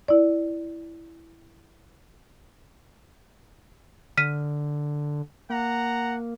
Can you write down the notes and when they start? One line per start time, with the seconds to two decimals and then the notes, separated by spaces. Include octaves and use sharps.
0.08 E4 D5
4.17 D3 F6 B6 D#7
5.50 A#3 F#5 A#5